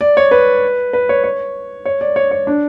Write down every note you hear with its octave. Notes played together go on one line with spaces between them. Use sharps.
D5
C#5
B4
B4
C#5
C#5
C#5
D5
C#5
C#5
D4